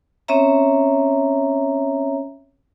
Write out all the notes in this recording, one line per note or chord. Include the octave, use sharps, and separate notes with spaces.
C4 C#4 C#5 E5 A#5